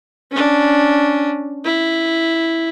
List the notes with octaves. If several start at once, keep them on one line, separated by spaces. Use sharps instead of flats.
C#4 D4
E4